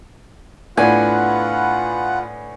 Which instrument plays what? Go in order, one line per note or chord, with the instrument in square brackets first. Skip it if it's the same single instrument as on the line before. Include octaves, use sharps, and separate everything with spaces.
[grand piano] A2 B3 D4 [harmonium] F4 B4 F#5 [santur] G#5